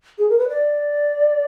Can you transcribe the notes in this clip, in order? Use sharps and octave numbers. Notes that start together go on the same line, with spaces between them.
G#4
A#4
B4
D5